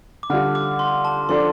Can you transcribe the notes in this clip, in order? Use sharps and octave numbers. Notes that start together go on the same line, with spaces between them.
D6
D3 G3 F4 A4 F6
D6
C6
A5
F3 D4 A4 C6